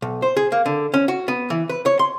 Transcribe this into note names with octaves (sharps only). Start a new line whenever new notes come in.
B1
C5
G#4
A#3
D3
C#4
F#4
B3
E3
B4
C#5
C6